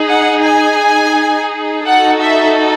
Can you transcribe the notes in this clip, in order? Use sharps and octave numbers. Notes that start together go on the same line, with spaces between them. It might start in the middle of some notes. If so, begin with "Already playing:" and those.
Already playing: D#4 G#4
F#5
G#5
D#4 F#4 A4 F#5
E5